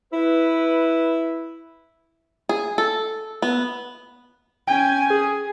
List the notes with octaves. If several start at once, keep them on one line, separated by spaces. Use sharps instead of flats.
E4 B4
G#4
A4
B3
C#4 G5 G#5
G#4